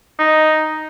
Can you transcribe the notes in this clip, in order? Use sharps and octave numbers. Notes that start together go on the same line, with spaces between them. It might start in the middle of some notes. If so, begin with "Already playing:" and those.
D#4